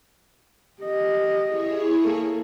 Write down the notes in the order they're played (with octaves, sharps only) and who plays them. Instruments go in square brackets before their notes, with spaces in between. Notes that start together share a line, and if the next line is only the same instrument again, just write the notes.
[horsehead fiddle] G4 D#5
[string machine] E4 G#4 C#5
[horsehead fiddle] A#3 A4